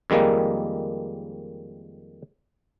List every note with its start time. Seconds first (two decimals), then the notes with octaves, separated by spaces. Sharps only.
0.10 F2 D#3 G3 G#3 A#3